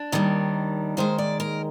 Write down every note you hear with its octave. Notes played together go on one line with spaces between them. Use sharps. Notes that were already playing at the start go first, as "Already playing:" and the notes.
Already playing: D4
D#2 D#3 G3
D#2 D#3 G#3 C5
D5
A#4